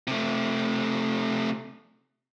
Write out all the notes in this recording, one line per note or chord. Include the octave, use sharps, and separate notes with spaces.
C3 A3